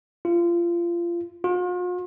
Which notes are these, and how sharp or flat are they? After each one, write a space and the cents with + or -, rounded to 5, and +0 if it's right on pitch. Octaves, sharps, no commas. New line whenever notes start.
F4 -25
F4 +45